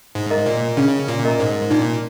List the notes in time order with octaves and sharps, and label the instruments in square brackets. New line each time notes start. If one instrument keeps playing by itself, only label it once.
[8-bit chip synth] G#2
[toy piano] A#4 D#5 A#5
[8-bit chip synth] A#2
[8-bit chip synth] C#3 [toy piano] C#4
[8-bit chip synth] A#2
[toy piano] A#4 D#5 A#5
[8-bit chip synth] G#2
[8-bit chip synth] A#2 [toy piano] D#4